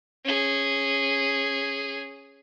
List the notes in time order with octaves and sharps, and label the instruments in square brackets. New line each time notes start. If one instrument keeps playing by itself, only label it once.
[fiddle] C#4 G#4